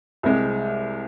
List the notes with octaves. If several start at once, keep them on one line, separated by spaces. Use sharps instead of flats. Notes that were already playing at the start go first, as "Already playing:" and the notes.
C2 C3 G#3